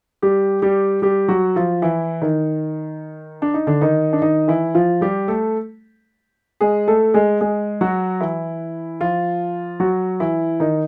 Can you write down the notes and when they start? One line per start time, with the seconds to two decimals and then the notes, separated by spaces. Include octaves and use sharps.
0.22 G3 G4
0.62 G3 G4
1.02 G3 G4
1.28 F#3 F#4
1.56 F3 F4
1.82 E3 E4
2.22 D#3 D#4
3.42 D4
3.54 D#4
3.67 D3 D4
3.81 D#3 D#4
4.13 D4
4.22 D#3 D#4
4.48 E3 E4
4.75 F3 F4
5.01 G3 G4
5.28 A3 A4
6.61 G#3 G#4
6.88 A3 A4
7.14 G#3 G#4
7.41 G#3 G#4
7.81 F#3 F#4
8.20 E3 E4
9.01 F3 F4
9.80 F#3 F#4
10.20 E3 E4
10.60 D#3 D#4